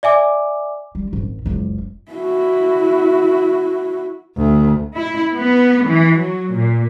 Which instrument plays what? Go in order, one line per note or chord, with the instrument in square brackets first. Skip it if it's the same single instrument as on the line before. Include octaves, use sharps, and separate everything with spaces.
[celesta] D5 E5 G#5 D6
[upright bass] G3
G#1
F#1 C#2
[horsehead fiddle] E4 F#4
[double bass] D2
[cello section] E4
B3
E3
F#3
A#2